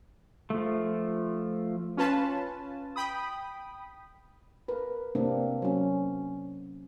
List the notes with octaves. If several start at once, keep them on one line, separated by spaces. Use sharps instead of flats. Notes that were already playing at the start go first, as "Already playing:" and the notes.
F3 A3
C#4 F4 B4 A5
G5 B5 D#6
A#4 B4
C3 A#3 C4 D4
F#3 C#4